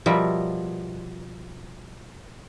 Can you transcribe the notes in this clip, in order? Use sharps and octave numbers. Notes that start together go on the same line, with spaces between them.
B2 F3 G3 A#4 E5